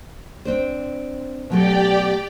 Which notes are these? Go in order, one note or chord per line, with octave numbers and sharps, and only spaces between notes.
C4 D4 C5
B2 F#3 A3 G4 D5 G5